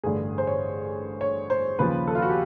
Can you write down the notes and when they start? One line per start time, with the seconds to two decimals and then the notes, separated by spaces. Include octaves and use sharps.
0.03 A1 G2 D3 G#4
0.38 C5
0.47 C#5
1.21 C#5
1.50 C5
1.79 D#2 C#3 F3 B4
2.07 A4
2.15 F4
2.22 F#4
2.30 G4